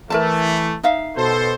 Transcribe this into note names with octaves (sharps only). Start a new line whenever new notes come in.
E3 A3 A#4 E5 A5
D#4 E5 F5
B2 A4 C5